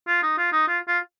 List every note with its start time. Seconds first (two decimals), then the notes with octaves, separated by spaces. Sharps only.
0.07 F4
0.23 D#4
0.37 F4
0.52 D#4
0.68 F4
0.88 F4